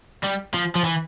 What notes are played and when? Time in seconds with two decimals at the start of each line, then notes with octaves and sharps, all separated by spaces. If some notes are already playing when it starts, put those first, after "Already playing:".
0.24 G3
0.54 F3
0.75 F3
0.85 E3